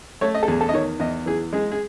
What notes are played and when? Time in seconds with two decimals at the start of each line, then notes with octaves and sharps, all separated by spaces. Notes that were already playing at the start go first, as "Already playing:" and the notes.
0.21 A3 C#5
0.34 D#5
0.43 A4
0.48 E2 G#4
0.61 A4
0.69 D#5
0.73 D#3 C#5
1.00 E2 D#5
1.26 E3 G#4
1.53 G#3 G#4
1.72 G#4